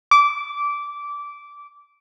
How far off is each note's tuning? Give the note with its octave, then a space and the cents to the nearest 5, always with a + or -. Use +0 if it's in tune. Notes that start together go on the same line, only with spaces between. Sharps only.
D6 -15